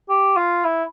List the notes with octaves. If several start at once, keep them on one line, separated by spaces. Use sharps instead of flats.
G4
F4
E4